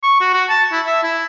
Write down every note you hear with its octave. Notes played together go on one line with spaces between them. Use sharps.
C#6
F#4
F#4
A5
E4
E5
E4